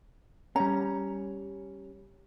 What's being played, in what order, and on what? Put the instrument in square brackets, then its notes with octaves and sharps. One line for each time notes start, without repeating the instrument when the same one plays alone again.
[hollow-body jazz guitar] G3 C#4 [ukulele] A#5